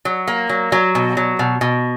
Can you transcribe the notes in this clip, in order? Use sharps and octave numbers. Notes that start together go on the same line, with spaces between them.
F#3
A#3
F#3
F#3
B2
F#3
B2
B2